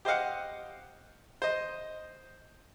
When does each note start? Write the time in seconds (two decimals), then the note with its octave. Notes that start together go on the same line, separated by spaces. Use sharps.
0.05 G4 C5 D#5 F5 F#5
1.42 C5 D#5